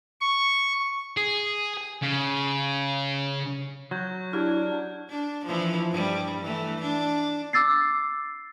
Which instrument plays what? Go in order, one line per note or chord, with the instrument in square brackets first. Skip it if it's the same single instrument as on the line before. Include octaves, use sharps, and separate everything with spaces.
[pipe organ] C#6
[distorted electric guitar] G#4
C#3
[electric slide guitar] F#3 [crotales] C#6 G6
[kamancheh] D4 [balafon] E4 G4 [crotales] F6 G#6
[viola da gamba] D4
E3 F3
G2 G3
E3 A3
D4
[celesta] D6 E6 A6 C7